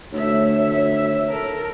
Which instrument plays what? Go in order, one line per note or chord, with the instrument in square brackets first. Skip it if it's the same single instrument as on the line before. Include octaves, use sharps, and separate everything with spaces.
[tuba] D2 [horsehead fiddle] A3 E5 [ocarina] C#5
[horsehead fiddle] E5
A4 A#4